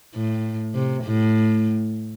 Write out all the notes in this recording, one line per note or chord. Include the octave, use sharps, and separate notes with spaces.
A2
C3
A2